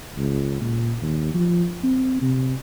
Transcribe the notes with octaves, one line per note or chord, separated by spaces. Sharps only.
C#2
A#2
D#2
F3
C4
C3